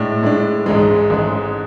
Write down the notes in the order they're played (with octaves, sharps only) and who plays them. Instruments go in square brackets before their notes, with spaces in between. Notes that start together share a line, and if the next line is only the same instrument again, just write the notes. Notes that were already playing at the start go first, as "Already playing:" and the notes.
Already playing: [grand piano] A2 G#3 D4
A2 G#3 D4
A1 G#2 G#3
A1 G#2 G#3